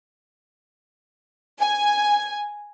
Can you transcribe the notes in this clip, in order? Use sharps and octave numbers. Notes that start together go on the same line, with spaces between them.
G#5